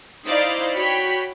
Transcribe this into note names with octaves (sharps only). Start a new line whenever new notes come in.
D#4 E4 C5 D5 F5
F#4 C#5 G5 B5